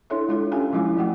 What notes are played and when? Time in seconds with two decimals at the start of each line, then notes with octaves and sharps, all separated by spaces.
0.10 D4 E4 A4 C#5 E5
0.29 G#3 F4 A4
0.52 C#4 G4 A4 F5 G5 G#5
0.73 F3 F#3 G#3 E4 F4
0.97 F3 A3 F#4 F#5 G5